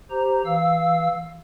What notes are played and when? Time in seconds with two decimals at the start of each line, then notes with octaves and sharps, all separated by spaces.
0.11 G4 C5 A#5
0.45 E3 F5 E6